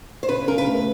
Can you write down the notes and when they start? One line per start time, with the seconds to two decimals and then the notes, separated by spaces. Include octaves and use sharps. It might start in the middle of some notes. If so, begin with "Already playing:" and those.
0.23 C5
0.29 C#3 B4
0.48 C#3 A#4
0.58 B4
0.67 A3